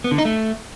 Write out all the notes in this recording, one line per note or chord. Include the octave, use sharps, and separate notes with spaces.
B3
D3
D#4
A3